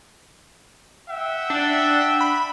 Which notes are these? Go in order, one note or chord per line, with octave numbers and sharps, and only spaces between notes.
E5 F#5 G5
D4
B5